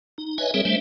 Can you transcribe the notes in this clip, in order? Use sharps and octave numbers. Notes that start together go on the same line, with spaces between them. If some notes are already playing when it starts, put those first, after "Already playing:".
D#4
B4 C#5 D#5 E5 G#5
G3 C4 G#4 A#4 C#5 E5
G3 A3 D4 C5 E5